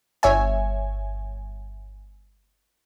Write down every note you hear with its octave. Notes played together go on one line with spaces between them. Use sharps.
G1 C#5 E5 G#5